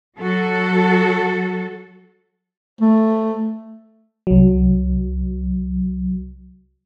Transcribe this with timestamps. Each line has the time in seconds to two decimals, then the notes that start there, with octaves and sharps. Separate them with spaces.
0.19 F#3 F#4 A4
2.81 A3
4.27 C2 F#3